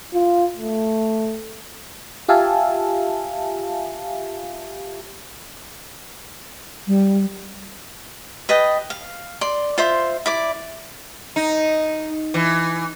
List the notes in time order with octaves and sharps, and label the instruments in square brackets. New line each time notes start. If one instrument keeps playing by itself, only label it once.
[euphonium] F4
A3
[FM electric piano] F4 G4 E5 F5 G#5 A5
[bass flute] G3
[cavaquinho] B4 D#5 G5 A5
F5
D5 C6
F4 C5 E5 C6
E4 D5 D6
[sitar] D#4
E3